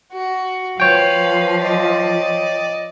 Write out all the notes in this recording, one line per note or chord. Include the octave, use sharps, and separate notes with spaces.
F#4
F3 B4 C#5 F5 G5
D5 D#5